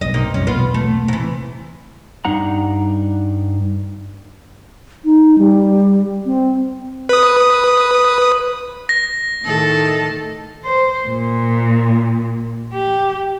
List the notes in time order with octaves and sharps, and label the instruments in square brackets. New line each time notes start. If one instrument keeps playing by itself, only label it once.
[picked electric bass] B1 G2 [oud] D#5
[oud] C3 A#3 D#4
[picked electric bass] F#1 C2 G3 [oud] C#4
[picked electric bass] E1 B1 A#3 [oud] B3 F4
[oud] A3
C3 E3
[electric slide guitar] G2 D4 D#4 F#5 A#5
[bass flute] D#4
G3
C4
[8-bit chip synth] B4 D#6
[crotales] A#6
[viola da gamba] A2 D#3 A4
[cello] C5
A#2
G4